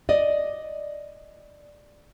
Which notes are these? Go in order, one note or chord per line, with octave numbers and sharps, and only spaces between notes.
D5 D#5